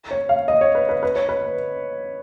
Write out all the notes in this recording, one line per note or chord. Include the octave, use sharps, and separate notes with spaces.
C#5
F5
D#5
C#5
B4
B4
B4
C#5
B4